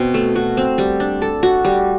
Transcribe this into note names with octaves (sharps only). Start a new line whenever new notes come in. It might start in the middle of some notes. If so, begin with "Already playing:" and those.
Already playing: B2 C4
A3
F#4
C4
G3
D4
A4
F#4
G3